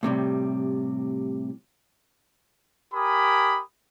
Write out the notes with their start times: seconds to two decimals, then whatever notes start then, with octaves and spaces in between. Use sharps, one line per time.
0.03 A2 C3 G3
2.94 G4 A#4 G#5 B5 D#6